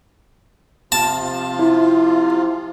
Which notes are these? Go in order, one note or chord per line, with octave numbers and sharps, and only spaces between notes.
C3 F3 F4 A5
E4